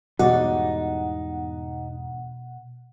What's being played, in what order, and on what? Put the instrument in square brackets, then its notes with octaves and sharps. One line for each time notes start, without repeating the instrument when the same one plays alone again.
[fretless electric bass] E2 G#2 G3 [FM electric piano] B2 F#5 [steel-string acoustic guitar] D#4 [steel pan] F#4 D5